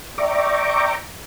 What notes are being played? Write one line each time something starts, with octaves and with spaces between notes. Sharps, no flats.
D5 E5 G5 A#5 C#6 D6